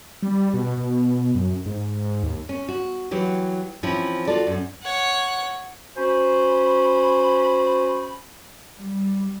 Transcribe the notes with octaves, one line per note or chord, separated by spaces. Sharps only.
G3
B2
B2
F#2
G#2
G#2
D#2
C#4
F#4
E3 F#3 G4
E3 F3 C4 C#4 E4 F4
F4 F#4 A4 D5
F#2
C#5 F#5
C#4 F#4 C5 G#5 B5
G3